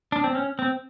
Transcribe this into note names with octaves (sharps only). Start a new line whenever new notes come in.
D4
C4
C#4
C4